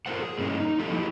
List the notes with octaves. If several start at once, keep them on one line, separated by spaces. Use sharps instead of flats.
F4 A4 A#4 C5 F#5
G#4
G2 A#3 C#4 E4 D#5
D#4
F3 A#3 G4 A4 D#5
E4 G4 G#4